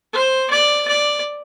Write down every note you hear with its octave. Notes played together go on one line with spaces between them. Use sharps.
C5
D5
D5